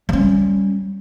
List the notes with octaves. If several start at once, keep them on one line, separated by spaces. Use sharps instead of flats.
G3 C#4